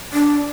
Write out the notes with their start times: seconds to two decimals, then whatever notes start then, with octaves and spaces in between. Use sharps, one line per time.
0.13 D4